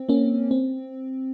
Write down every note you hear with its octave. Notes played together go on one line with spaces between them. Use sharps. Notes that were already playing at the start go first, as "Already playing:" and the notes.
Already playing: C4
A#3 C#4
C4